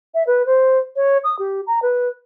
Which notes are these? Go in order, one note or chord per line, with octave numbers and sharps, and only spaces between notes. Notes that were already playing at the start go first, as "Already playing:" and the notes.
E5
B4
C5
C#5
D#6
G4
A#5
B4